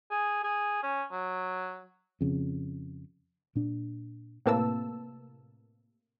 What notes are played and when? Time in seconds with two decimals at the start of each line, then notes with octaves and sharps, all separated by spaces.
0.11 G#4
0.44 G#4
0.83 C#4
1.12 F#3
2.21 F2 C#3
3.55 A#2 D4
4.46 A2 C3 A#3 B4 A5 E6